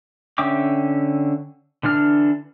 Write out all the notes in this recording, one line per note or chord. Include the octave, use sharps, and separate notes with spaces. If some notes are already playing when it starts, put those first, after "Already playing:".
D3 C#4 E5 G5 D6
D3 E3 D4 F6